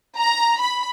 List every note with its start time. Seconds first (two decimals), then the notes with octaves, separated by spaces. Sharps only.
0.17 A#5
0.61 B5